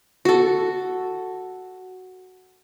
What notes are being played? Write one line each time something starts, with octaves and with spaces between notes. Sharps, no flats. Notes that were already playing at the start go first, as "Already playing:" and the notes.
F#4 A4